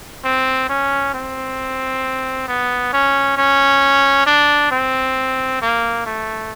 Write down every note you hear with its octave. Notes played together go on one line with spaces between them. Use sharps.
C4
C#4
C4
B3
C#4
C#4
D4
C4
A#3
A3